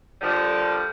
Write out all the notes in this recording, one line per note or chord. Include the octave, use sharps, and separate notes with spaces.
A#2 D3 F3 G3 A5